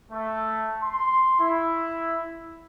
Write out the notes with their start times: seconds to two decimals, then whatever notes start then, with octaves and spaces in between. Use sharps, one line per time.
0.12 A3
0.82 C6
1.40 E4